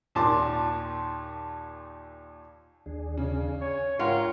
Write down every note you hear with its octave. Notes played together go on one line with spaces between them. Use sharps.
D#2 A#2 A5 C6 D6
D#2 D4 G#4
C#3
C#5 G#5
G#2 D4 F4 A#4 C#5 F#5 G5